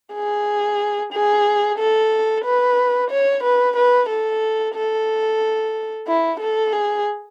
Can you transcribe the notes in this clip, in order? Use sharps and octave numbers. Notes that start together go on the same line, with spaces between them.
G#4
G#4
A4
B4
C#5
B4
B4
A4
A4
E4
A4
G#4